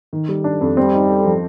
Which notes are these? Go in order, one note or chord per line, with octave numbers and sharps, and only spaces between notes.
D#3
G3
D4
F2
G3 C4
D#4
A4
F3